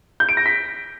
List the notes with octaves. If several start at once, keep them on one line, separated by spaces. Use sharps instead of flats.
G6
D7
A#6
B6